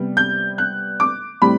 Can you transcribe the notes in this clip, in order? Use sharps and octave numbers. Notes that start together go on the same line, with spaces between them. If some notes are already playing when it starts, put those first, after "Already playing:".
Already playing: C3 G3 B3
G6
F#6
D6
A2 G3 C4 B5